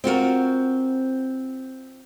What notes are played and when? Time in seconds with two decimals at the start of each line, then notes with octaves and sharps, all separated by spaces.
0.04 C4 F4 F#4 A#4